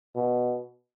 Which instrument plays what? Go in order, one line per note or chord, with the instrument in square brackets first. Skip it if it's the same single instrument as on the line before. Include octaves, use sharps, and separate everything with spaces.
[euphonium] B2